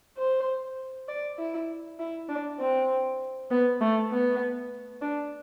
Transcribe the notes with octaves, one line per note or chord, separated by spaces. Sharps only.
C5
D5
E4
E4
D4
C4
B3
A3
B3
D4